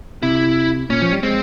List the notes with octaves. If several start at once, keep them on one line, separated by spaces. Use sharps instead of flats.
C3 E4
A#2 C#4
F3
G3
G#3 C4